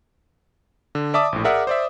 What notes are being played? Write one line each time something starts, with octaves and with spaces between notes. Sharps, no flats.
D3
D5 E5 A5 D6 D#6
A#1 A2
G#4 A#4 D5 E5 F#5
C5 D5 E5